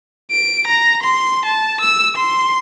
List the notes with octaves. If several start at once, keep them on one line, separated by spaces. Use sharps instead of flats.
D7
A#5
C6
A5
E6
C6